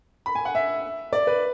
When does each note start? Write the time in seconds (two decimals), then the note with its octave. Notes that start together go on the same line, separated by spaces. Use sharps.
0.26 B5
0.35 G#5
0.45 F#5
0.55 E5
1.13 D5
1.27 B4